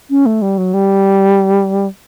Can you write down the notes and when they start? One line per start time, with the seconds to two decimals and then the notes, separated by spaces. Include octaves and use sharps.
0.10 C#4
0.26 A3
0.42 G3
0.58 F#3
0.74 G3